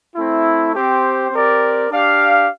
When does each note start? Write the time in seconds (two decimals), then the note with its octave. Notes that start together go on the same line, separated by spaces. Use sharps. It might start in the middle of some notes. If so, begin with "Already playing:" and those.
0.15 A3 C4 E4
0.73 C4 G4 C5
1.31 C4 G4 A#4 D5
1.90 D4 G4 D5 F5